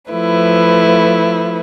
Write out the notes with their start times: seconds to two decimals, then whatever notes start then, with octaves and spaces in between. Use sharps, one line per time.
0.12 F3 A3 E4 B4